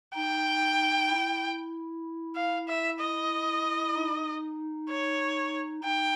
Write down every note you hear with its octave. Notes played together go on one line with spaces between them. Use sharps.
D#4 G5
E4
F5
E5
D#5
D#4
C#5
D#4 G5